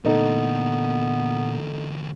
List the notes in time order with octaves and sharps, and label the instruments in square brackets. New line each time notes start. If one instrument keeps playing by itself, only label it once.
[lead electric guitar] E2 D3 [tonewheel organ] A#2 [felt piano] A3 D#4 A4 [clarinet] B3